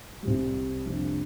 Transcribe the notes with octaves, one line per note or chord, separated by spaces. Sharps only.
C2 C3 G3
F2 C3 G3 A#3 D4